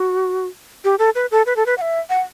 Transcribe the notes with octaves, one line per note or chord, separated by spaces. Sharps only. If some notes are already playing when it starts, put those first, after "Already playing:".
Already playing: F#4
G4
A4
B4
A4
B4
A4
B4
F#5
E5
F#5